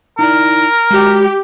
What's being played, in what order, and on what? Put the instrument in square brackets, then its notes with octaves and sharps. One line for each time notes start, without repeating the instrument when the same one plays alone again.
[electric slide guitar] D#4 E4 D5 [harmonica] A#4
[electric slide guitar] G#3 F#4 [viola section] G4